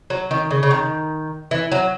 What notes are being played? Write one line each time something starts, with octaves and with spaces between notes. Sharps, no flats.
F#3
D#3
C#3
C#3
D#3
E3
F#3